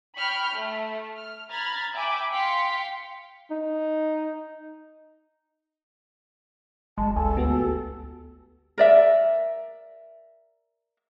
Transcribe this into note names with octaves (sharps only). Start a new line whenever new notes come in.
G5 B5 C#6 F6 G6
A3
F6
A#5 B5 F6 G#6 A6
E5 G5 G#5 B5 D6
F5 G5 C6 B6 C#7
D#4
G1 G#3 A5
C#2 A4 G#5
D2 B3 F#4 G4
A#4 D5 E5